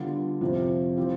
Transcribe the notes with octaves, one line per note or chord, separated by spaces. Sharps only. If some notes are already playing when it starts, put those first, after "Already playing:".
Already playing: D3 G3 B3 D4 F4
F2 C3 F3 C4
E3 G3 C4 F4